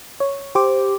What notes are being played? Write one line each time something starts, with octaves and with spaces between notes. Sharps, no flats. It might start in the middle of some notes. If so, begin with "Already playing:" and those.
C#5
G4 C5 D6